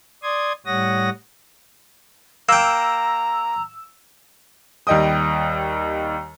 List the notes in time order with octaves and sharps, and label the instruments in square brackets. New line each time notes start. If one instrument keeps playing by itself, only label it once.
[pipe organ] D5 C6 D#6 G#6
A2 G3 C#5 F#5 D#6 A#6
[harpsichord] A#3 G5 [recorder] A#5 [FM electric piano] E6
[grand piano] D#2 G3 D#5 G5 D#6